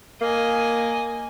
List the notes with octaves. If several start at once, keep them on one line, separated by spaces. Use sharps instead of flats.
A#3 D#5 G#5